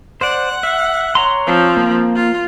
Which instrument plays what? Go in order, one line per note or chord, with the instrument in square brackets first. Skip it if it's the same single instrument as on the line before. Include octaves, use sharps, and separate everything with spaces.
[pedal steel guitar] C5 D5 [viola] F#5
[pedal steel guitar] E5
C#5 A#5 C6
[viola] F3 C4
[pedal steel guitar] A#3
[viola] F4